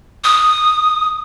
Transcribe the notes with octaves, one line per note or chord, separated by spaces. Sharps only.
D#6